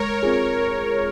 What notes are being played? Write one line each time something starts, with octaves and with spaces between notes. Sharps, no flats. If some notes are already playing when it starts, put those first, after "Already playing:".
Already playing: G#3 A#4 C#5
C4 F4 G#4